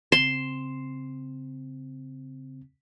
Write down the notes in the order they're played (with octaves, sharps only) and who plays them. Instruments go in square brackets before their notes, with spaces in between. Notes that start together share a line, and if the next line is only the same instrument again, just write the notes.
[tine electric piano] C#3 C4 [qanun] C6 [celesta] E7